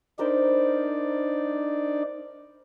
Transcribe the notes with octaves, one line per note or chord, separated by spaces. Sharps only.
D4 D#4 A#4 C5 D5 B5